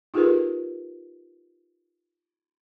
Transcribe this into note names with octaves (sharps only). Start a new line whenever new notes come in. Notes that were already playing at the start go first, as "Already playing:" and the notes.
D#4 F4 G4 G#4 A#4 B4